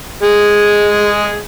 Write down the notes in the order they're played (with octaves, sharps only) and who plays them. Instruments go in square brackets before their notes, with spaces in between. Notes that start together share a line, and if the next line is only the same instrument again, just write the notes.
[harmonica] G#3 G#4